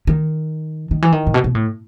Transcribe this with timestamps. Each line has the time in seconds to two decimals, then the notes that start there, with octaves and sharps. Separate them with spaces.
0.07 D#3
0.91 D#3
1.02 E3
1.12 D#3
1.27 A2
1.34 B2
1.44 B2
1.55 A2